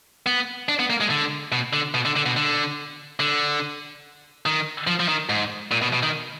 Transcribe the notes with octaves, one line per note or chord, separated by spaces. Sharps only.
B3
D4
B3
A#3
G#3
D3
B2
D3
B2
D3
D3
B2
D3
D3
D#3
F3
F3
D#3
G#2
A#2
B2
B2
D#3